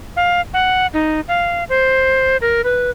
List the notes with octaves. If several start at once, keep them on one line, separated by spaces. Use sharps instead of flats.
F5
F#5
D#4
F5
C5
A#4
B4